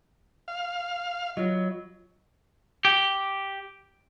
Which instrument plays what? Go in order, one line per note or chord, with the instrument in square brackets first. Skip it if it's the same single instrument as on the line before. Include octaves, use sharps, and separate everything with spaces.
[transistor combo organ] F5
[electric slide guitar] F#3 [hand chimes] F4 D#5
[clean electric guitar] G4